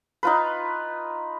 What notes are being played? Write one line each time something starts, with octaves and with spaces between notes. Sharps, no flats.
D#4 F4 B4